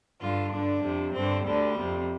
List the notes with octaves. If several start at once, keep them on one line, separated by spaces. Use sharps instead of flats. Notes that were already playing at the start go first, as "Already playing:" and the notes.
G2 D3 F4
G2 D3 D4
F2 C3
G2 D3 C4
D2 D3 G3
F2 C3